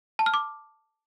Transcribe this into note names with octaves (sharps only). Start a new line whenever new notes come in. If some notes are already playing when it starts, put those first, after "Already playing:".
A5
F6
D6